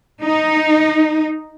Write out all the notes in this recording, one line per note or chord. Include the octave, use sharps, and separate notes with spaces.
D#4